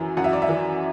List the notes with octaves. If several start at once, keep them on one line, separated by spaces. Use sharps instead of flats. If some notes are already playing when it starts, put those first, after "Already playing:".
Already playing: F#2 E3
F#2 F#5
E5
D5
E5
E3